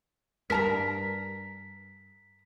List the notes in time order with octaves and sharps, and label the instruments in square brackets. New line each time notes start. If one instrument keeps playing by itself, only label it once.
[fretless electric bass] G2 [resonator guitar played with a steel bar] A#4 A5 A#5 [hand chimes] B6